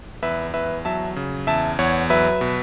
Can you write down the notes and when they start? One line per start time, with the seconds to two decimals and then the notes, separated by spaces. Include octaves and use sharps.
0.23 E2 B4 E5
0.54 E2 B4 E5
0.85 F#3 E5 A5
1.16 C#3
1.47 E2 E5 A5
1.79 E2 C#5 F#5
2.10 F#3 B4 E5
2.41 B2